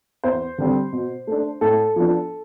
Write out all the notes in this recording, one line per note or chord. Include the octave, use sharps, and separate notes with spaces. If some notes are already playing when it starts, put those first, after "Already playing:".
E2 C5
D3 G3 C4
B2
A3 D4
A2 A4
F3 B3 D4